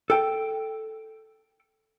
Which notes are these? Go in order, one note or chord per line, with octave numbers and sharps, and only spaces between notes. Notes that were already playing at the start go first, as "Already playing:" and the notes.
A4 G5